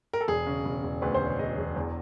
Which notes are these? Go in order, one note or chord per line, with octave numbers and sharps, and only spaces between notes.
A#4
A4
E1 G#4
C#3
E1
E1
D2 B4
C5
E1
C#5
E1 D#5
E1
E2